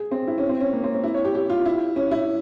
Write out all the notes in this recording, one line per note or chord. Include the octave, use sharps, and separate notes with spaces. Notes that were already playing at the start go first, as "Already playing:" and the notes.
Already playing: G#4
C4
E4
C#4
C4
C#4
A#3
C4
C#4
E4
C#5
G4
G4
F4
E4
C#4
E4